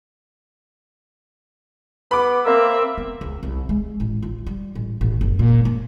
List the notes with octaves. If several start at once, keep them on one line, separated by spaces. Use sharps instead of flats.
B3 B5 D6
A#3 C4 A#4 E5
B3
C#2
C2
G#3
A1
F4
G3
A1
A1
F#1
A#2
A#3